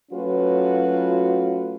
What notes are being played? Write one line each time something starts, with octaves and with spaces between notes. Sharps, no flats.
F#3 A3 C#4 F4 F#4 B4